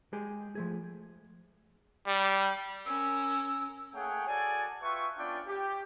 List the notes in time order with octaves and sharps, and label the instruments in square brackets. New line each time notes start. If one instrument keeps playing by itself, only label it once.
[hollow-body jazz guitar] G#3 G4 G#4
F3 A3 G#4
[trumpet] G3
[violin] C#4 A#4 [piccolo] E6
[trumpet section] A3 A#3 G#4 C#5 F#5 G5
F#4 G#4 A4 D5 G#5
F4 B4 E5 G5 C#6
B3 C#4 D4 F4 D5 G5
G4